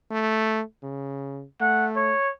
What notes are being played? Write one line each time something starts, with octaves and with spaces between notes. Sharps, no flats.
A3
C#3
A3 F#5
C#5